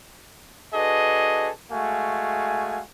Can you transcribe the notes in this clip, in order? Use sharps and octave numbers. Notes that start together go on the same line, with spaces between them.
D4 F#4 G#4 A4 B4 D#5
G#3 A3 F#4 F5 G#5